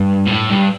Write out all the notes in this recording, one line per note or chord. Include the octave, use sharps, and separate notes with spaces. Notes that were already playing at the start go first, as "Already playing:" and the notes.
Already playing: G2
A2
G2